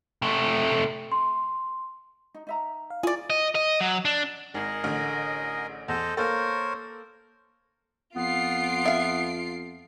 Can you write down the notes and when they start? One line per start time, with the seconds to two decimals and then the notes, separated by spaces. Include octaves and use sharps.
0.22 C3 A3
1.12 C6
2.34 D#4
2.47 D#4 E5 A#5
2.90 F5
3.03 E4 F4 G#4 D5
3.30 D#5
3.55 D#5
3.80 F#3
4.05 D4
4.54 G#1 G#4 A#4 D#5
4.84 A1 D3
5.88 E2 A4 C5 D#5
6.17 A#3 A4 A#4 C5 C#5
8.16 F2 B3 F4 C7 D7
8.85 E5 F5